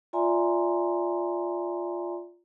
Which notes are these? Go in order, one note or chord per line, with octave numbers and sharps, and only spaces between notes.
F4 D5 E5 G#5 A#5 C6